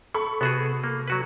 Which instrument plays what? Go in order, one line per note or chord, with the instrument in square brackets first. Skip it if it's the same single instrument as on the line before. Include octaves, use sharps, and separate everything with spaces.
[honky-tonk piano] A4 B5 C#6
[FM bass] C3 [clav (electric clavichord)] B3 F#4 G#4
[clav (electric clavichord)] A#3
F#3 F#4 B4